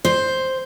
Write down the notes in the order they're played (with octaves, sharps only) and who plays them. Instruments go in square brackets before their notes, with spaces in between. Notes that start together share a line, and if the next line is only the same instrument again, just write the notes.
[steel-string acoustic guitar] C5